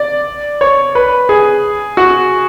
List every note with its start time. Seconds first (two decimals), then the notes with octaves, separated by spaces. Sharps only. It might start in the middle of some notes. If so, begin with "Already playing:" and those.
Already playing: D5
0.61 C#5
0.95 B4
1.29 G#4
1.97 F#4